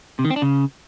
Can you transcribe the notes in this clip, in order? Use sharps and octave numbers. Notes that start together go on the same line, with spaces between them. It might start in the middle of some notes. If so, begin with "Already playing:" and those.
C3
D#3
C4
D4
C#3